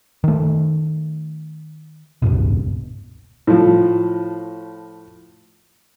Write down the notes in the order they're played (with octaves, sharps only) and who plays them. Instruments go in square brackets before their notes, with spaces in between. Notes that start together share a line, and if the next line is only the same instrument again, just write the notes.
[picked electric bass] D#3 A3
E1 C#2 G2 B2
[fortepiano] A2 F3